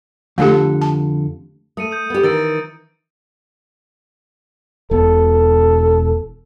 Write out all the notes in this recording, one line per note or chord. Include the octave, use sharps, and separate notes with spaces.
F2 D3 A3 G4 A4
A5
A3 D#6 C#7 D#7
D#6 G6
B3 G4
D#3 E3 E6 A6 D7
E1 B2 A4